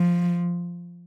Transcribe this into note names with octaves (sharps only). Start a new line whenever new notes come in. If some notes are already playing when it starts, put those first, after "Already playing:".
Already playing: F3